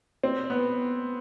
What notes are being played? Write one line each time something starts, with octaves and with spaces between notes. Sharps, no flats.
C4
B3